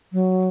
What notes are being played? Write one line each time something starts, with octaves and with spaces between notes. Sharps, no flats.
F#3